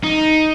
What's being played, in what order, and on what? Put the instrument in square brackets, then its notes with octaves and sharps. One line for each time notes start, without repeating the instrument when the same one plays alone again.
[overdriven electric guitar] D#4